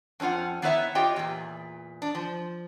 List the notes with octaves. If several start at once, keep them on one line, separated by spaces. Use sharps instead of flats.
F2 C#4 D4 F4 F#5
D#3 B3 E4 C#5 E5
F4 G4 C#5 D#5 G5
E2 A#2
D4
F3